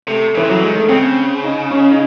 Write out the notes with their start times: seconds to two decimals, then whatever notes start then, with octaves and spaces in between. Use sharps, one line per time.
0.07 C3 A3
0.35 C#3 E3
0.43 C3
0.50 C#3 F#3
0.56 E3
0.62 D#3 G#3
0.76 A3
0.89 C#3 C4
1.43 D#4
1.71 C#4
1.91 D#4